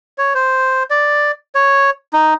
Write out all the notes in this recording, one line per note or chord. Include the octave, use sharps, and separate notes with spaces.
C#5
C5
D5
C#5
D#4